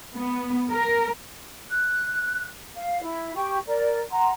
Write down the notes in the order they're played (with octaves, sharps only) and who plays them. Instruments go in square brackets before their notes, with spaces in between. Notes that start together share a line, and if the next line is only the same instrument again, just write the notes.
[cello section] B3
A#4
[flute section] F#6
F5
E4
G4 G5 C#6
A#4 D5
F#5 A#5 C6